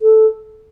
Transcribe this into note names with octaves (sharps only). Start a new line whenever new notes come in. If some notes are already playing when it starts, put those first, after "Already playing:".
A4